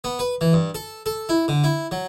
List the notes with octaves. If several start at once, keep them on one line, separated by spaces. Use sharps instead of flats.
B3
B4
E3
G2
A4
A4
E4
D3
E4
F#3